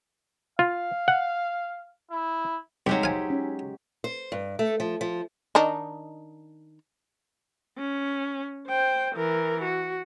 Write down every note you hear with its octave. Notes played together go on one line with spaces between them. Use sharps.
F4 F5
F#5
E4
C2 F#3 G#3 D#4 G4 B6
C5 F5 G#5
C#4
C5
G2
A3
F3
F3
D#3 D4 D#4
C#4
C5 G5
E3 A#4
F#4